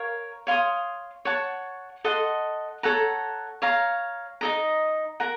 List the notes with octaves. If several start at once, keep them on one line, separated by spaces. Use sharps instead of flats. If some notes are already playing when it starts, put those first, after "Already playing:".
Already playing: A#4 C#5 F5
C#5 F5 C6 D#6
C#5 F#5 A5 C#6
A4 D#5 F#5 C6
A4 C#5 F#5 A#5
C#5 F5 A#5
D#4 A4 D#5 A#5
A#4 F#5 A#5